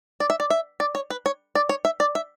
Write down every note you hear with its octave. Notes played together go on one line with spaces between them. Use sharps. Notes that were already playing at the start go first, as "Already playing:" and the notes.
D5
E5
D5
E5
D5
C#5
B4
C#5
D5
C#5
E5
D5
E5